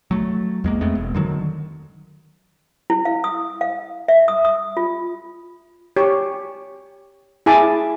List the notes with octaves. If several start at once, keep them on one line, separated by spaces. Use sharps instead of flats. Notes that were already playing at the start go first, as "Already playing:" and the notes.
F#3 A3
E2 G#3 A#3
G#3 A3 B3 C4
E1
D3 D#3 F#3
E4
F5
D#6
F5
E5
D#6
D#6
F4
G4 C#5
E4 G#4 G#5 A5 D6